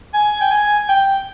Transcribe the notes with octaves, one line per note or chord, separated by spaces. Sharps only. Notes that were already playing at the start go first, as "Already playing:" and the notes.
G#5
G5
G#5
G5